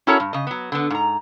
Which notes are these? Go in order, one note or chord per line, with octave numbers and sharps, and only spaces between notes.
C#4 E4 F#4 A4 A#4 C#5
G2
C#3 D#5
F#3 B3
D3 B3
G#2 A#5